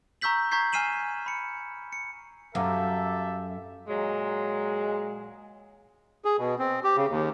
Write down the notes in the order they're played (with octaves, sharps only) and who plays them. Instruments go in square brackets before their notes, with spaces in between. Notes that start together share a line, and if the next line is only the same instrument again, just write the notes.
[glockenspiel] A#5 C#6 E6 G6 B6 F#7
A#5 C#6 G6 G#6 B6 C7
G#5 F6 C7 D#7 E7 F#7
B5 C#7
C#7
[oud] F#2 [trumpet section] G4 A4 E5 [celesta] F5 D6
[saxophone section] A#2 F#3 G#3
[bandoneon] G#4
B2
C4
G4
C#3
D#2